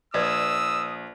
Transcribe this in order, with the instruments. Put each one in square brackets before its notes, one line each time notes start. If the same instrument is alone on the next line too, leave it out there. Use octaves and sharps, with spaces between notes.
[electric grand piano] A#1 [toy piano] B4 D5 D#5 [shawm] D#6 [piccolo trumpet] E6